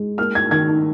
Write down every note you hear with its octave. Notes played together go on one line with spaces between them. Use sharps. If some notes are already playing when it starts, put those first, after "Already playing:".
Already playing: G#3
A#3 F6
G#6
D#3 G#6